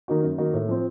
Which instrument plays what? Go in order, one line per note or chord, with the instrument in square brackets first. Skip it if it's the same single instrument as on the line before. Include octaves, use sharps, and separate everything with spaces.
[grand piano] D#3 A#3 D#4 F#4
F#2
D#3 A#3 D#4 F#4
A2
F3 C4